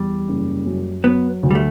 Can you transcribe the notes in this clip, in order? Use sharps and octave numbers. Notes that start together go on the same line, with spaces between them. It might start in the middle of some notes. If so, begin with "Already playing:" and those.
Already playing: E2 G3
F#1
F#2
F#3 B3
D2
G3
A3